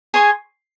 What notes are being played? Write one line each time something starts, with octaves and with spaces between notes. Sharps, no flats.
G#4 C#5 G#5 C6